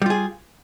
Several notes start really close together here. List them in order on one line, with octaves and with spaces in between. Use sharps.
G3 F4 G#4